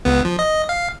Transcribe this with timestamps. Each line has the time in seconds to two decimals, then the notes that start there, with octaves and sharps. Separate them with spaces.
0.05 C#2 B3
0.25 F3
0.39 D#5
0.69 F5